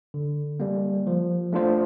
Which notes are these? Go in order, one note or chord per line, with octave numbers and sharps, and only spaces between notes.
D3
G3 A#3
F3
A3 D4 F4 C5